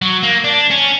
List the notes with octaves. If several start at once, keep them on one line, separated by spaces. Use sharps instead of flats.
F#3
A#3
D4
C#4